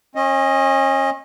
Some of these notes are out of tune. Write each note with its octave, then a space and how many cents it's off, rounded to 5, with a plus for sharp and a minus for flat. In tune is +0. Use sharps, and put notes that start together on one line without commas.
C#4 -35 D#5 +10